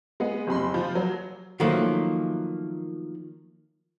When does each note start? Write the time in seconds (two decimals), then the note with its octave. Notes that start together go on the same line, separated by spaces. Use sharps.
0.20 G#3 B3
0.47 F#1 C3 B5 C6
0.74 F3
0.95 F#3
1.60 D#3 F3 F#3 A3 A#3